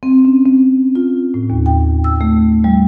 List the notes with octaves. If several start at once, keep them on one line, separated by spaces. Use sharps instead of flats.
C4
C#4
C4
F4
A2
D#2
G5
E6
A3
G3